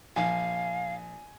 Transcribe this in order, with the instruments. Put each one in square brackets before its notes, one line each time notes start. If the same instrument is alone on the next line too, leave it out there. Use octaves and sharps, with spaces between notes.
[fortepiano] A#1 [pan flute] F5 [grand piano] G#5